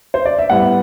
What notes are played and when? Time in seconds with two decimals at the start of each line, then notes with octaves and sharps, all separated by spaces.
0.14 C5
0.25 D5
0.38 E5
0.50 A2 G3 B3 E4 F#5